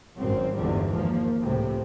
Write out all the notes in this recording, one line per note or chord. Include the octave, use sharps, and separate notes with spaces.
G#1 F#2 C4
G1 E2 G#2 B2 D3 G3
G#1 F3 A#3
C#2 A2 C3